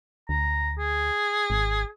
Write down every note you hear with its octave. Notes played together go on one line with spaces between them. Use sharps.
D2 A#5
G#4
G#1